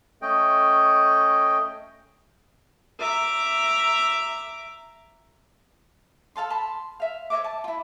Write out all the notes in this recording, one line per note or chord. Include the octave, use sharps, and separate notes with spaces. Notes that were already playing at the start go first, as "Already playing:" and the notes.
A3 C#4 D#5 G5
E5 A#5 D6
A4 F5 A5 C6
A5 B5 C6
E5 F5
C#5 D#5 E5 D6
A5
E4 F4